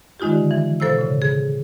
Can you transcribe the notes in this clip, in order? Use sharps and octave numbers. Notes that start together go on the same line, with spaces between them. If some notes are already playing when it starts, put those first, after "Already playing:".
D#3 G#3 D#4 F4 G4
D3
E3
B2 A4 C5 F5 E6
A2 C#3
G#4